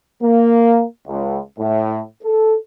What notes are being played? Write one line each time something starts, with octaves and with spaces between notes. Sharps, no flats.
A#3
C#2
A2
A4